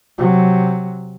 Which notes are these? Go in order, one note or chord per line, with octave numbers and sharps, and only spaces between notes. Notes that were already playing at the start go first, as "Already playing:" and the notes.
C3 F#3